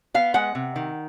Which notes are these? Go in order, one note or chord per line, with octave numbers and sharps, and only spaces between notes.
B3 F5
G#3 F#5
C3
D#3